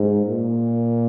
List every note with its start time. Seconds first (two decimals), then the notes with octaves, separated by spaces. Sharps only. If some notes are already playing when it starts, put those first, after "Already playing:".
Already playing: G#2
0.26 A#2